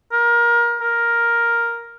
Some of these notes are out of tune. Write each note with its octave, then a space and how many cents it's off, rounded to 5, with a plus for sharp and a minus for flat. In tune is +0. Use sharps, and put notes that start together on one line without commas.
A#4 +25
A#4 +5